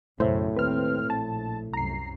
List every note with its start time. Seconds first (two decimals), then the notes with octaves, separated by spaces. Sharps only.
0.20 B1 F#2 A2 C#3 C5 E5
0.56 D#2 C4 B4 F6
1.10 A#1 A5
1.73 C2 F#2 A#5 C7